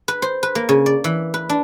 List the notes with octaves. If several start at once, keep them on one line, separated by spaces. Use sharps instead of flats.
B4
C5
B4
A#3
C#3
D5
E3
B4
D4